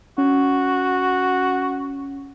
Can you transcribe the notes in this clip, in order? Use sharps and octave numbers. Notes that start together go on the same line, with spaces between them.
C#4 F#4